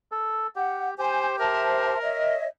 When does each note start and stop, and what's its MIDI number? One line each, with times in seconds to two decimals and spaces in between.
0.12 0.47 69
0.56 0.94 67
0.56 0.89 78
0.98 1.94 67
0.98 1.36 72
0.98 1.26 80
1.39 2.35 70
1.39 1.98 72
1.39 1.98 76
1.39 1.98 81
2.02 2.45 73
2.02 2.45 75
2.02 2.45 76